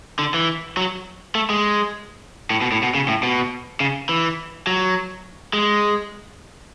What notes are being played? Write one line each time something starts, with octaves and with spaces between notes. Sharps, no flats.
D3
E3
F#3
A3
G#3
A2
B2
A2
B2
C#3
A2
B2
C#3
E3
F#3
G#3